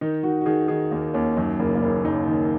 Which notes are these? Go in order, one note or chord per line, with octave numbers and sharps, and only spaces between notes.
D#3 D#4
D#3 F#4
F#4
D#3 G#4
D#3 G#4
D#2 A#3
D#2 C#4
F#2 D#4
F#1 A#3
A#3
F#1 C#4
F#1 D#4
D#3